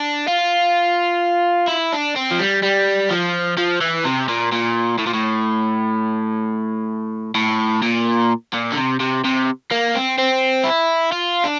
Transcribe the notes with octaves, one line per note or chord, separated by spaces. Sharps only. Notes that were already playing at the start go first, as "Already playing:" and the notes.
Already playing: D4
F4
E4
D4
C4
F3
G3
G3
F3
F3
E3
C3
A#2
A#2
A2
A#2
A2
A2
A#2
A#2
D3
C3
C3
C3
A#3
C4
C4
E4
F4
D4